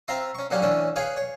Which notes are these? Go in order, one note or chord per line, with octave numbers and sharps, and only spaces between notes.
C4 F4 E5 A#5 C6
C#4 C#6
A#2 D3 F#3 A#3 C#4 G4
A2 D3 E3 C#4 D4
G#4 B4 C#5 F5 G5 G#5
C#5